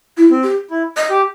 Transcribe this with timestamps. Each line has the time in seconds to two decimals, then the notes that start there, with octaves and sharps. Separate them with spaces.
0.17 E4
0.31 C4
0.43 G4
0.71 E4
0.97 D#5
1.10 G4